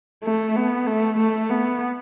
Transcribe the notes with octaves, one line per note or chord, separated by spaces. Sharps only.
A3
B3
A3
A3
B3